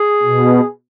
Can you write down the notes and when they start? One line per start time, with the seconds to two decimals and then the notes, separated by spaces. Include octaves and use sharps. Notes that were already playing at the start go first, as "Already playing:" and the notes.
Already playing: G#4
0.23 B2